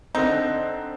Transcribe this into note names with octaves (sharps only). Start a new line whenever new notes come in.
D3 C4 D#4